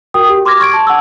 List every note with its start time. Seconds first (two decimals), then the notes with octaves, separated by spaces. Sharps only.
0.14 F#4 A#4 G5 D#6
0.30 G4
0.45 C6 D6 F6 G#6 A#6
0.60 C#6 G#6 D7
0.73 A5
0.87 F#5 A5 E6